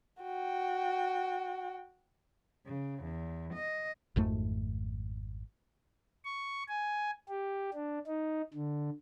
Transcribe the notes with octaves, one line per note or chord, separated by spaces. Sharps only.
F#4 G5
C#3
E2
D#5
G#1 F2 G#2 A3
C#6
G#5
G4
D4
D#4
D3